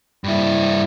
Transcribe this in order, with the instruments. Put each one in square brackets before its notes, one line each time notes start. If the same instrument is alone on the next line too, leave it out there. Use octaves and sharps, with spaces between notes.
[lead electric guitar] G2 E4